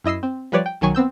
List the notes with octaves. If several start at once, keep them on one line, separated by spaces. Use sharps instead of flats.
F#2 E4 D#5 E6 C7
C4
F3 G3 B4 C#5 D5
G5
B1 D#3 F#3 G#5 C#6
B3 C4 E6 G6